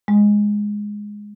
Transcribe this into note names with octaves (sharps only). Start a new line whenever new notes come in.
G#3